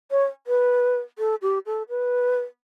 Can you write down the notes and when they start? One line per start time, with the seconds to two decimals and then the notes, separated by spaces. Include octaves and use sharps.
0.11 C#5
0.47 B4
1.18 A4
1.42 G4
1.66 A4
1.89 B4